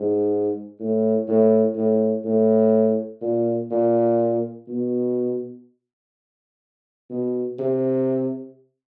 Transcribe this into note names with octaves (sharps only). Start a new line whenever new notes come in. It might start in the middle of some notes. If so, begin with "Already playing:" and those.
Already playing: G#2
A2
A2
A2
A2
A#2
A#2
B2
B2
C3